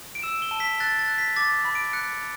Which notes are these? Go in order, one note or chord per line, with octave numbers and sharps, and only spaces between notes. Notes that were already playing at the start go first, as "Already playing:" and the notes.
D7
E6 E7
G7
A5
B6
F#6 A6
A6
F#6
B6
D6 A6
B5
D7
F#6 C#7